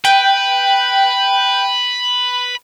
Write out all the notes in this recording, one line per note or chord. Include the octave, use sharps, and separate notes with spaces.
B4 G5